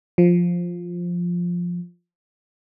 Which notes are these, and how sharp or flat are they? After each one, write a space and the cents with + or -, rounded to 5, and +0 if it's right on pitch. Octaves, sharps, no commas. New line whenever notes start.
F3 +5